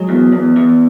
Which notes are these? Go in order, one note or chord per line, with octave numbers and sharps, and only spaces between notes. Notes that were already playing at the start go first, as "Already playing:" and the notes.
Already playing: F#3 G#3
E2
E2
E2